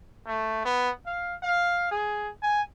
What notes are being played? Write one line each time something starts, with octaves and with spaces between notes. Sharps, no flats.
A3
B3
F5
F5
G#4
G#5